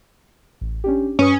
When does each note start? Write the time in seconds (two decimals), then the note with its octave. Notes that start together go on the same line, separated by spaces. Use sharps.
0.61 A1
0.84 C#4 D4 G4
1.19 G2 C#4 B4 D#6